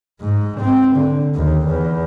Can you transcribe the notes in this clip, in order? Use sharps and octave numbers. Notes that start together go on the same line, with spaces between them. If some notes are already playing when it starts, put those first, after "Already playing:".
G#2
C4
D3
D#2
E2